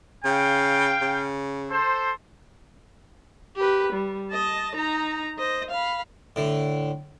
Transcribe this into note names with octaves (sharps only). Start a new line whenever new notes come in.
C#3 F5 G5
C#3
A4 C5
G4 B4
G3
D#5 A5
D#4 A#5
C5 D#5
F5 B5
A2 D3